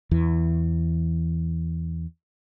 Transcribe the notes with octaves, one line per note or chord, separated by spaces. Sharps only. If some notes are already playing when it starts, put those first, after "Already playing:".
E2 E3